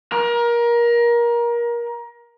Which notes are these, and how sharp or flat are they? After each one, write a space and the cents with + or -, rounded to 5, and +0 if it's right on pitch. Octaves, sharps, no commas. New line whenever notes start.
A#4 +25